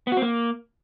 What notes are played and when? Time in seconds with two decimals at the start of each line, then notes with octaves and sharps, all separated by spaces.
0.07 B3
0.12 F#4
0.17 C4
0.22 A#3